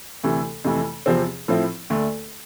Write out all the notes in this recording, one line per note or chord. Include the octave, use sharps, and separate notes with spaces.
D2 C3 E3 A3
F2 C3 E3 A3
E2 C3 F3 C4
A2 F3 C4 E4
D2 D3 A3